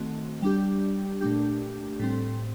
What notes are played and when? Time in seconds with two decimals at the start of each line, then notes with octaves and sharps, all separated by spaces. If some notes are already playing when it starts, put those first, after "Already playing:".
Already playing: D#3 A3 C4 F#4
0.42 G3 D4 G4
1.21 A#2 A3 D4 G4
1.99 A2 G3 C4